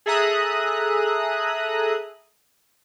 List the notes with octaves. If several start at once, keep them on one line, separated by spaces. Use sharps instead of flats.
G#4 A4 E5 A#5 D#6 F#6